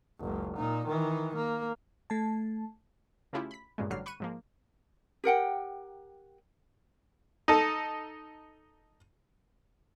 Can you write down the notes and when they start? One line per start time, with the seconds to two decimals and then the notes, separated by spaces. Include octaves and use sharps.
0.20 F#1 C#2
0.56 A#2 D#4
0.87 D#3 E3
1.35 A#3
2.10 A3 A5
3.33 C#3 A3 C#4 E4 F4 G4
3.51 B5 B6
3.78 G2 A#2 C#3 G#3
3.90 A1 D3 F#3 G3 F6 C7
4.06 B5 C#6 F#6 C#7 D#7
4.20 G#2 F3 A#3
5.24 G4 A#4 F#5 G5
7.48 D#4 A4